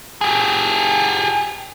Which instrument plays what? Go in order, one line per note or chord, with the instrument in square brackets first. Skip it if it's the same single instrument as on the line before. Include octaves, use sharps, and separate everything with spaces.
[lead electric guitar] G4 G#4